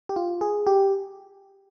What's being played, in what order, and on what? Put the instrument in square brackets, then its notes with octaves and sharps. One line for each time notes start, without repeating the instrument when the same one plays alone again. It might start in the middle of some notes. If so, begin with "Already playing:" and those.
[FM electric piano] G4
F4
G#4
G4